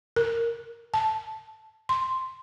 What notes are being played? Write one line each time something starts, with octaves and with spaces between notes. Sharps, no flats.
A#4
A5
C6